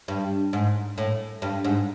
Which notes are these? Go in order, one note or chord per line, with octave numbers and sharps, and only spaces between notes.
G2
G#2
A2
G2
G#2